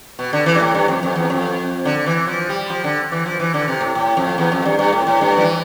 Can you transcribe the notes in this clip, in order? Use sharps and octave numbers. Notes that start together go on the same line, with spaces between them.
B2
D3
E3
G2
A2
G2
F2
F2
E2
F2
D3
E3
F3
G3
F3
D3
E3
F3
E3
D3
C3
A2
A2
F2
E2
F2
G2
G2
A2
A2
G2
F3
E3